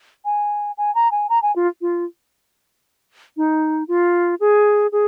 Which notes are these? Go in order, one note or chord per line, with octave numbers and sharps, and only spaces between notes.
G#5
G#5
A#5
G#5
A#5
G#5
F4
F4
D#4
F4
G#4
G#4